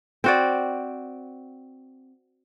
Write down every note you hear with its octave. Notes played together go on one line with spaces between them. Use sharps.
C4 F#4 D5